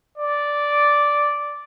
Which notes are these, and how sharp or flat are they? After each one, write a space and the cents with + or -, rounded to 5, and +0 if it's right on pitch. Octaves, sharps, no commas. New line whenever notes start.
D5 -5